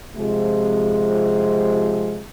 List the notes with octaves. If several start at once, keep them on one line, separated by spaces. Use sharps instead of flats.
C3 F3 G#3